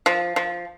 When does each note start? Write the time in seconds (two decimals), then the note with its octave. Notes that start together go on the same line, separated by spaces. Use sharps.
0.06 F3
0.36 F3